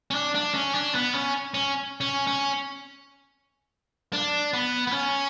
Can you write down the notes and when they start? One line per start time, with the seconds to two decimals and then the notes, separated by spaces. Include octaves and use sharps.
0.11 C#4
0.15 D4
0.35 D4
0.54 C#4
0.74 D4
0.95 B3
1.14 C#4
1.54 C#4
2.01 C#4
2.27 C#4
4.13 D4
4.53 B3
4.87 B3
4.92 C#4